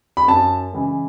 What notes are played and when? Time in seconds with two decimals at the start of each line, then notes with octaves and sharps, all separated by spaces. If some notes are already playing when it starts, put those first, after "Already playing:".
0.17 B5
0.28 F#2 A5
0.73 C#3 E3 G#3